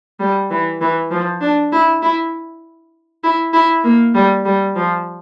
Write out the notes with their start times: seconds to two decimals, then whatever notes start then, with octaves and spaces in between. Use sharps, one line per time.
0.20 G3
0.51 E3
0.81 E3
1.11 F3
1.41 D4
1.72 E4
2.02 E4
3.24 E4
3.53 E4
3.84 A#3
4.14 G3
4.45 G3
4.76 F3